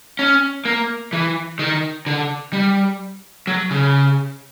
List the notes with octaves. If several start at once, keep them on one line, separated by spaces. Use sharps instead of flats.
C#4
A#3
E3
D#3
D3
G3
F#3
C#3